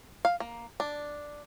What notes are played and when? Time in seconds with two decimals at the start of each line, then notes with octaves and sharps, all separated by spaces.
0.25 F5
0.40 A#3
0.80 D4